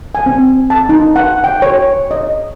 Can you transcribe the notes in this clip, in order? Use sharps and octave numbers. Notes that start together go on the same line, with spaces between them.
G#5
C4
A5
D#4
F#5
G5
C#5
D#5